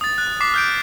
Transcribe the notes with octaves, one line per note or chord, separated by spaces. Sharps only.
D#6 A6
F#6
D6 B6 C7
F6 G6 D7